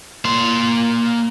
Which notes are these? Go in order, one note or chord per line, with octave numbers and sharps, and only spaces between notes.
A#3 C6